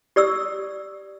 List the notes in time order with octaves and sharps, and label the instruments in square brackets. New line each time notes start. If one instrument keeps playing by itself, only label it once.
[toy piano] G4 D5 D#6 E6